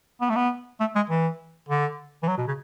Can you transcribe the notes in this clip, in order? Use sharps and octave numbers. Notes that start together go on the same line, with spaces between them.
B3
A3
B3
A3
G#3
E3
D3
E3
F#3
B2
C#3